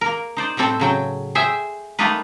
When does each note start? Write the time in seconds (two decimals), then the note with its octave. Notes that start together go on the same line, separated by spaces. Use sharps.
0.01 A#3 A#4
0.37 D#4 C5 D5
0.57 A2 G3 C4 A4 C5
0.80 C#3 F#3 G5
1.35 G#4 C5 E5 G5
1.99 G3 A3 A#3 D#4 F4 B4